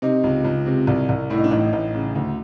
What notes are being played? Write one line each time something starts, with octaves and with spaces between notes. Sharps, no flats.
C3 D#4
C#2
C#2
C3
C2
C2
A2 E4
D#4
D4
A1 D#4
A1
C#3
D2